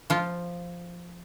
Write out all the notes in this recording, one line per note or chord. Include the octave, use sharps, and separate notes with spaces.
F3 F4